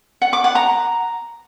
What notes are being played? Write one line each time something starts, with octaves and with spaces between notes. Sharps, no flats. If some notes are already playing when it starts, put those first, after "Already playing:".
F#5
D6
F#5
A#5